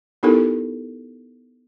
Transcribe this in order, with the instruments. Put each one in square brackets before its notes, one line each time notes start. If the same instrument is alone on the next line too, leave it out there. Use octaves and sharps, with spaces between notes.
[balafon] B3 D#4 E4 G4 A4 A#4